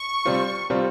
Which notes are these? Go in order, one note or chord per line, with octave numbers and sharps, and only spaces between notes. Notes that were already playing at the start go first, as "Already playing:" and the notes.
Already playing: C#6
C3 G3 C4 F4
C3 G3 C4 F4